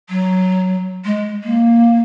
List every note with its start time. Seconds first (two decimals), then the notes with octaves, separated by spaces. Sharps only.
0.10 F#3
1.05 G#3
1.44 A#3